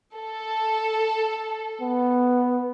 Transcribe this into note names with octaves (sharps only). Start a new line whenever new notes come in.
A4
B3